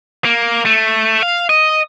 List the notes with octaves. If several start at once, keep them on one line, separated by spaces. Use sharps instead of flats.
A#3
A3
F5
D#5